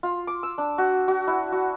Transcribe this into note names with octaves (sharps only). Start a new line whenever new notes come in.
F4
D6
E6
D4
F#4
F#4
E4
F#4